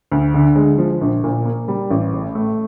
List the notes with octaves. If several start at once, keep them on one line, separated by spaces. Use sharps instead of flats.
D2
D3
G#3
F3
A#1
A#2
A#3
G3
A1
A2
A3